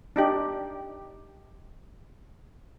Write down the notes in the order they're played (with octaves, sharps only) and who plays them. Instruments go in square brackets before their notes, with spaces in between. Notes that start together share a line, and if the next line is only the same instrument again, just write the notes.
[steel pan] D4 D#4 G4